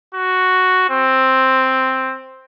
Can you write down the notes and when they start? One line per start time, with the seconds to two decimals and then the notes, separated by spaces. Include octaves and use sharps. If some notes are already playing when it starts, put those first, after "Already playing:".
0.14 F#4
0.90 C4